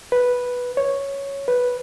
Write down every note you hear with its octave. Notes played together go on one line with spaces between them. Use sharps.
B4
C#5
B4